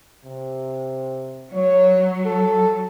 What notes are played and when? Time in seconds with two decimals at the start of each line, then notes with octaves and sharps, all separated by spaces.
0.25 C3
1.53 F#3 C#5
2.26 A4